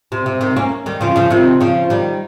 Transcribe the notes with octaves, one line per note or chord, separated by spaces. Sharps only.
C3
C3
C3 D#3
A#3 C#4
D#3 G3
C#3 F3
C#3 F3
C3 D#3
C#3 F3
D#3 G3